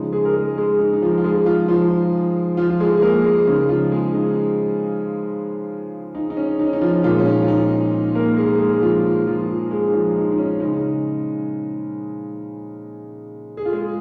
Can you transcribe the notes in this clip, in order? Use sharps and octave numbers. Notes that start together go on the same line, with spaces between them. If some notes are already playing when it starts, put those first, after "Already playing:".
Already playing: C#3 F3 G#3 D#4
G#3 G#4
A#4
G#3 G#4
G#3 G#4
D#4
D#4
F3 F4
F4
G#3 G#4
F3 F4
F3 F4
F3 F4
F4
G#3 G#4
G#4
A#3 A#4
G#3 G#4
C#3 G#3 D#4
F3 F4
G#3 G#4
D#4
D#4
D#4
C#4
D#4
C#4
D#4
F3 F4
A#2 F3 G#3 F4
C#4
D#4
F4
D#4
A#3 A#4
G#3 G#4
G#3 G#4
F3 F4
F3 F4
G#3 G#4
D#4
F3 F4
D#4
D#4
C#4
C#3 G#3 D#4
G#4
F4
G#3 G#4